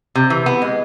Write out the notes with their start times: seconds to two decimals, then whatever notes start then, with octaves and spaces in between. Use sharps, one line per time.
0.15 C3
0.30 E3
0.46 B3
0.62 G#3